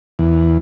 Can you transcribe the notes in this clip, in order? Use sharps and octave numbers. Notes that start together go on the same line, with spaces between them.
E2